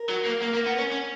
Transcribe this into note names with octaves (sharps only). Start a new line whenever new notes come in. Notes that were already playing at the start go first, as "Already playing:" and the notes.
Already playing: A#4
F#3
A#3
A#3
A#3
B3
C#4
C#4